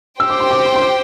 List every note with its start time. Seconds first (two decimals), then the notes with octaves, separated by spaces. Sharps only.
0.20 G4 C5 G5 E6
0.30 D6
0.40 C6
0.51 D6
0.66 C6
0.76 C6
0.81 D6